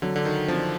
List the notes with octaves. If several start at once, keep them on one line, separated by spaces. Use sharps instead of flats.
D3 F#3
D3
D#3
F3 D4